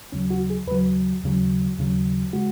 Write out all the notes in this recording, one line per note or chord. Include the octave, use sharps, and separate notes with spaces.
D#2 C#3 F#3 C#4
F#4
G#4
D#2 C#3 F#3 B4
D#2 C#3 F#3
D#2 C#3 F#3
C#3 G#3 F#4